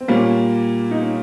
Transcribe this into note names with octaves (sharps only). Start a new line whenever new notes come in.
C4
A#2 G3 A#3 C#4
D#4
C#4